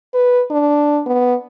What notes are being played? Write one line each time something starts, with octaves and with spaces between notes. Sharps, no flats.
B4
D4
B3